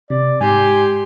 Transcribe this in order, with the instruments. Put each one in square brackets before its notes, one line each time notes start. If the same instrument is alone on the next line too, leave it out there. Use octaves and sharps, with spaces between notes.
[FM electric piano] C3 [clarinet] D5
[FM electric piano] G#2 [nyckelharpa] G4 C6 [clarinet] G#5